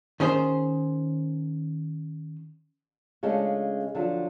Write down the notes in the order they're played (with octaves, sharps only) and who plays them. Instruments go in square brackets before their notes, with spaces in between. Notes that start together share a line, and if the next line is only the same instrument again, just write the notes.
[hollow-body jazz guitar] D#3 C#4 G#4 C5
[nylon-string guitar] C#3 G#3 A3 C#4 D4 F4
D3 F3 F#3